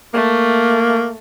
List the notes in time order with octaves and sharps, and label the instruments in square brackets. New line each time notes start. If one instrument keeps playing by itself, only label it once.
[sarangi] A3 [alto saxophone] A#3